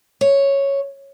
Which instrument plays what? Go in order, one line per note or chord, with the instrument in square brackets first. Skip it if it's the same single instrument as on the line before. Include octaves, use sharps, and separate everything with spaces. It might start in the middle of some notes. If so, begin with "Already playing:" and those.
[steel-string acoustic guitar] C#5